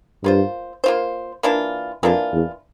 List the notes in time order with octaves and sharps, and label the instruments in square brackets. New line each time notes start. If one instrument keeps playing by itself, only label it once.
[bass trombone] G2 [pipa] A#3 F4 C5
[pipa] A#3 F4 C5
E3 A#3 D4 F4
[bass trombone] F2 [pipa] E3 A#3 D4 F4
[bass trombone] E2